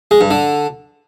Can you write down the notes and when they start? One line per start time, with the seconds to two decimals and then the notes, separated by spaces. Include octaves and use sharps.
0.11 G#3
0.21 G2
0.30 D3